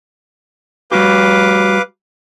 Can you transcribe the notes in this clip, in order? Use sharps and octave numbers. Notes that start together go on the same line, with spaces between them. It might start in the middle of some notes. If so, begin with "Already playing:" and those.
G3 F#4 G4 B4 F5 D6